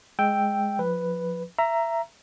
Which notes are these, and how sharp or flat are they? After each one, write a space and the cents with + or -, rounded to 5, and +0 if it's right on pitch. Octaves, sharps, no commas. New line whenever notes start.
G#3 +0 G5 +0 E6 +0
F3 +25 B4 +0
E5 +20 A#5 +0